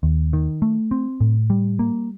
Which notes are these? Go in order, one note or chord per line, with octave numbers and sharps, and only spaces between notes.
D#2
D#3
A3
C4
A2
G3
A#3